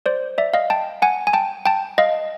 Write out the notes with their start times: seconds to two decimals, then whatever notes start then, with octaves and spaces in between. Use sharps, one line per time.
0.06 C5 D5
0.38 D5 E5
0.54 D#5 F5
0.70 G5 A5
1.02 F#5 G#5
1.27 G#5
1.33 G5 A5
1.66 G5 A5
1.98 D#5 F5